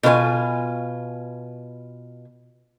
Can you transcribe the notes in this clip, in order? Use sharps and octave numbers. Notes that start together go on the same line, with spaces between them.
B2 F4 C5 G#5